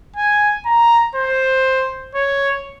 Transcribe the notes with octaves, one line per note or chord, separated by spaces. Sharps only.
G#5
A#5
C5
C#5